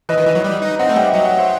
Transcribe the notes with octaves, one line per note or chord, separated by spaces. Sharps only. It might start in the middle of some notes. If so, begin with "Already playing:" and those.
E3 B4 D#5
D#3
E3
F#3
G3
D#4
C4 D#5 F#5
A3
G3 E5 G5
F#3 D#5 F#5
D#5 F#5
C5 E5